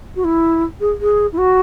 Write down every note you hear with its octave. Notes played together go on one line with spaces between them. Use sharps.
F#4
E4
G#4
G#4
E4
F#4